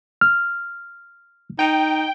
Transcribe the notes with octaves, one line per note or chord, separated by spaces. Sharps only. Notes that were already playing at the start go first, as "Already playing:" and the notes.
F6
D#4 G5